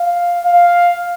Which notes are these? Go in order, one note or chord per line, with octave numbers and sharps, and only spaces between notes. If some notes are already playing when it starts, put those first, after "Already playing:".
Already playing: F5
F5